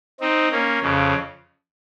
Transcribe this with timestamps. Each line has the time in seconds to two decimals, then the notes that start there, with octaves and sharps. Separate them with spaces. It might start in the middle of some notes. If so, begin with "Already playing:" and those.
0.20 C4 D#4
0.51 A#3 C#4
0.82 F2 C#3